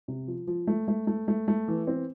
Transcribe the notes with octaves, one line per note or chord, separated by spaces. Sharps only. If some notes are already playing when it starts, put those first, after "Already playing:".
C3
F3
F3
A3
A3
A3
A3
A3
E3
C4